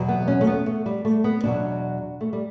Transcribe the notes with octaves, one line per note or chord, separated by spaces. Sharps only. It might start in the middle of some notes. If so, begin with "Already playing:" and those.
Already playing: E2 B2 F#3
B3
C#4
A3
B3
A3
G3
A3
B3
E2 B2 F#3 D4
A3
G3